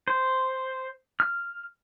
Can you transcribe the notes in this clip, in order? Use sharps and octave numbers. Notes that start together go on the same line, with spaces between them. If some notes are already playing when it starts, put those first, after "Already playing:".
C5
F6